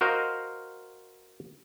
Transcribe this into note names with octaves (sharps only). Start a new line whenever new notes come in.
F#4 A#4 C5 D#5 F5